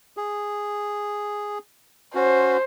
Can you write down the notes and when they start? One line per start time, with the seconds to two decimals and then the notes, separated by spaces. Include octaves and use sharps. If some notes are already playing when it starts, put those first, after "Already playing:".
0.17 G#4
2.15 C#4 F#4 C5